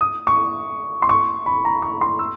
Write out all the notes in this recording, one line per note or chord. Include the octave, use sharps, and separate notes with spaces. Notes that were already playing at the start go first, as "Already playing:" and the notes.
D#6
C#6
C6
C#6
B5
A#5
C#6
C6
E6